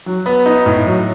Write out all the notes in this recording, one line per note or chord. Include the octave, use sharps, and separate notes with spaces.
F#3
B3
D#4
A2
F#3